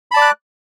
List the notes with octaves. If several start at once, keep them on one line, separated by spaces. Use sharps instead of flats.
D5 A5 B5 D6 F#6